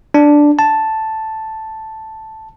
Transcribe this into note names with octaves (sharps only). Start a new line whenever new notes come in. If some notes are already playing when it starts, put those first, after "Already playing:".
D4
A5